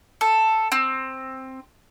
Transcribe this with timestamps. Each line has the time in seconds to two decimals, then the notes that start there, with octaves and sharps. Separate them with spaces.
0.21 A4
0.72 C4